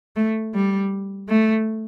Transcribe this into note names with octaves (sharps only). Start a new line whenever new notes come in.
A3
G3
A3